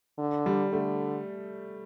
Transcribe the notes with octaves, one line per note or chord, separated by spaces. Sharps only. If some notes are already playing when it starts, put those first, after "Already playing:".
D3
G3
D3 A3